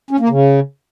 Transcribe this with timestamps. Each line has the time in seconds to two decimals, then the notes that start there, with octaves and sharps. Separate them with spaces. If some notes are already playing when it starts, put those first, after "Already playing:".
0.11 C#4
0.20 A#3
0.29 C#3